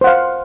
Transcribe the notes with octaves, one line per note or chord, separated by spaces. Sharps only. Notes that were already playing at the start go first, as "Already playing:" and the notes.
C5 F5 F#5